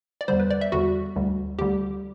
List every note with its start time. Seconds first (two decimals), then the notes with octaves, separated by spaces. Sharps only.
0.21 D5
0.28 E2 D3 G3 C5
0.39 B4
0.50 D5
0.61 E5
0.72 E2 D3 G3 F#4
1.16 D2 D3 G3
1.59 D2 D3 G3 G4